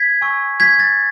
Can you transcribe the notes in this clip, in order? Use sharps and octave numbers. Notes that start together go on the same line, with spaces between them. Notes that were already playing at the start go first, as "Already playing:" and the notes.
Already playing: G#6 B6
G#5 C#6 E6
G#6 B6
A6